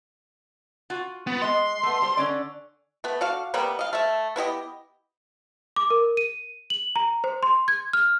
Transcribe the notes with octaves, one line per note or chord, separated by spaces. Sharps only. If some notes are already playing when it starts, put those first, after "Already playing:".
F4 F#4
B3
G#3 D#5 C6
A3 B3
G3 C5
D3 C#4 D5
A3 B3
D3 F#4 F5
C3 G3 A#3 B3
D#5 F5
A3 E5
B3 E4 G4 D#5
D6
A#4
D#7
F#7
A#5
C5
C6
G#6
F6